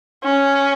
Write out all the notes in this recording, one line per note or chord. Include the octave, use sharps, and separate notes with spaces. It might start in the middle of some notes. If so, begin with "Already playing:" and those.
C#4